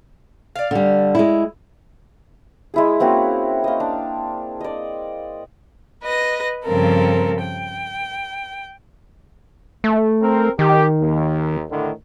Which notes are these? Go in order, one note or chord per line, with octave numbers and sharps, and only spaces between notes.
D5 F5
D3 G3
G#3 E4
G#3 E4 G#4
A#3 C4 C#4 F#4
D#5 F5
D4
D5 D#5
B4 D#5 A#6
G2 C#3 F3 C4 A4 A#4
G5
A3
C4 A#4
D#3 G4
D#2
A2 D3 D#3